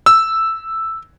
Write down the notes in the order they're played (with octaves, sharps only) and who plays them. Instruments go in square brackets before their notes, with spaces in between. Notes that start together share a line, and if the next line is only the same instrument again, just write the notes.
[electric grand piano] E6